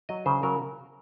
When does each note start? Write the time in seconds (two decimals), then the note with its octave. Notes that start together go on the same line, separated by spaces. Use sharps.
0.09 F#3 D#5
0.26 C#3 C5
0.43 F#3 A#4